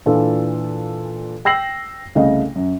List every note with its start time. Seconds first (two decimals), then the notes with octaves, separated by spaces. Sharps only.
0.06 A#2 E3 D4 F4 A4
1.45 G5 E6 A#6 C7 F#7
2.15 C2 C#3 A3 D#5 F5
2.56 F#2